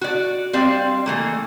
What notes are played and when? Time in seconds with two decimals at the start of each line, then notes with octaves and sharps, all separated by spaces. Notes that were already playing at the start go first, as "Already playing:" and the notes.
0.01 F#4 D5
0.53 G3 C4 D5 F5
1.06 E3 A3 A#3